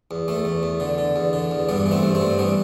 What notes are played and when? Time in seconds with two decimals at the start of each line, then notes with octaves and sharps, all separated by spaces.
0.11 E2
0.28 E2 A3
0.45 E2
0.63 E2
0.80 D3
0.98 D3
1.16 E2
1.33 D3
1.51 E2
1.69 G2 G3 B3
1.86 E3
1.91 A3 C4
2.03 G2
2.15 A3 C4
2.21 G2
2.38 E3 G3 B3